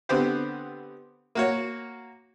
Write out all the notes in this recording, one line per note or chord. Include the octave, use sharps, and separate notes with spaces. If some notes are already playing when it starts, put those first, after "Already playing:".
D3 B3 C4 G4 C5
A#3 F#4 C#5